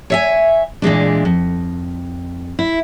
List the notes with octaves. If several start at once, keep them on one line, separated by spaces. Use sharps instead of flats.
C#5 E5 G#5
A#2 E3 G#3 D4
F2
E4